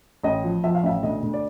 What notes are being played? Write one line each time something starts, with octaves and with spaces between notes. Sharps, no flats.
A1 D#5
F3
F3 E5
F5
A1 E5
D2 D#5
D2
D5